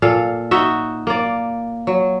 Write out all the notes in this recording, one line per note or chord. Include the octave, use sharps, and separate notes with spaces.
A#2 A4 F5
D#4 F#4 E5
A#3 D5
F#3